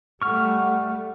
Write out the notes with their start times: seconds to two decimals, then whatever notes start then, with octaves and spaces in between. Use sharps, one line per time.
0.22 G3 A3 F#5 C#6 F6